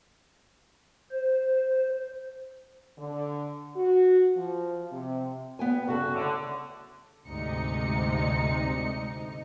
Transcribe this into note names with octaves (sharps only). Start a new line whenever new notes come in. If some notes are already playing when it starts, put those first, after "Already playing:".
C5
D3
F#4
F3
C3
B3 G5 G#5
G2 C#3 F#4 A4
A2 D3
D2 G#2 C3 D#4 C#7